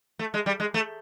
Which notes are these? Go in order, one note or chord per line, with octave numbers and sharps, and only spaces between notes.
A3
G#3
G3
G#3
A3